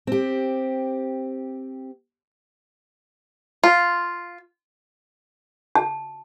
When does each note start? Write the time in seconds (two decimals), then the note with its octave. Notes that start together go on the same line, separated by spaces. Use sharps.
0.07 C4 G4
3.64 F4
5.75 A5